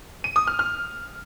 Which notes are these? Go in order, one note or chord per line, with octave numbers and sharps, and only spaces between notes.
D#7
D#6
F6
F6